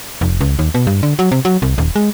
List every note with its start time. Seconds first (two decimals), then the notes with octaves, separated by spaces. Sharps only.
0.21 F1
0.41 C#2
0.59 D#2
0.74 B2
0.87 G2
1.03 D3
1.19 F#3
1.32 C3
1.45 F#3
1.62 C2
1.78 D#1
1.96 G#3